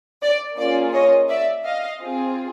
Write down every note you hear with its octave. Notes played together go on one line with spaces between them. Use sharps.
D5
A#3 C#4 F4 G#4 D5
C#5 D#5
D5 E5
D#5 F5
C4 F4 G#4